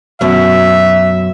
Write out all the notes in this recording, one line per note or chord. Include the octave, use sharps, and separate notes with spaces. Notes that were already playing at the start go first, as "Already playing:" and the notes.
F#2 B2 E5